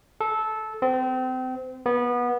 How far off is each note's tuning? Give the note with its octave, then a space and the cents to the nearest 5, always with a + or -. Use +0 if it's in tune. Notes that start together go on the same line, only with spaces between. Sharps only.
A4 -15
C4 -30
B3 -20